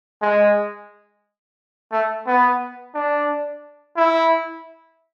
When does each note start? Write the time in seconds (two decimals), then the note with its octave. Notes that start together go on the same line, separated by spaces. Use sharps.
0.22 G#3
1.92 A3
2.26 B3
2.94 D4
3.97 E4